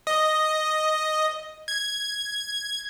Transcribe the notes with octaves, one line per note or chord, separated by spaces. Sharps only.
D#5
G#6